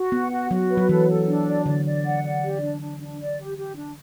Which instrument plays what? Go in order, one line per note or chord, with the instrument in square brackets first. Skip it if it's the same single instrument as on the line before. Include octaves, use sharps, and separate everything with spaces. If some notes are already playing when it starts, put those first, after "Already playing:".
Already playing: [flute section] F#4
[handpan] B3 [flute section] F#5
[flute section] F#4
[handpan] F#3 [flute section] F#4
[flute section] B4
[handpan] F#3
[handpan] E3 [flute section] A4
[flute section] A4
D4
D5
[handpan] D3 [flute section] D5
[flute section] D5
F#5
D5
G4
D4
D4
D4
D5
G4
G4
D4